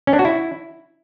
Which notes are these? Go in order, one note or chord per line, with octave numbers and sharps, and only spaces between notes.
C#4
D4
F#4
E4